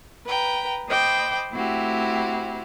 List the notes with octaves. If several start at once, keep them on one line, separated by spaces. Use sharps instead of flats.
B4 G5 A#5
C5 D#5 G5 B5 D6
A3 C4 E4 F#4 G4